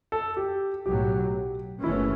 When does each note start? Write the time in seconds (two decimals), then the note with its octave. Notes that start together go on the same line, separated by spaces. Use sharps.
0.12 A4
0.37 G4
0.85 B1 A2 F#3 G4
1.83 F#1 E3 A3 C#4 E4